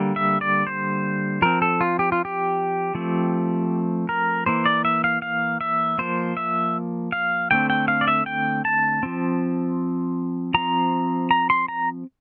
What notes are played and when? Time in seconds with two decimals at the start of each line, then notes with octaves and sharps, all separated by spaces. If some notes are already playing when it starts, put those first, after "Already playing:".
Already playing: D3 G3 A#3
0.16 E5
0.41 D5
0.67 C5
1.42 F3 C4 A#4
1.62 A4
1.81 F4
1.99 G4
2.12 F4
2.25 G4
2.95 F3 A3 C4
4.09 A#4
4.46 E3 A#3 C5
4.66 D5
4.85 E5
5.04 F5
5.22 F5
5.61 E5
5.98 F3 A#3 C5
6.37 E5
7.12 F5
7.51 D3 A3 C4 G5
7.70 G5
7.88 F5
8.01 D5
8.08 E5
8.26 G5
8.65 A5
9.03 F3 C4
10.54 F3 C4 A#5
11.31 A#5
11.50 C6
11.68 A#5